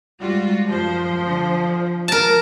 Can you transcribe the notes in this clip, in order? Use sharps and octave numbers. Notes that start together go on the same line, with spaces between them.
G#2 G3 F4 F#4
F#2 F3 C5
D3 C5
F3 A#3 A#4 A5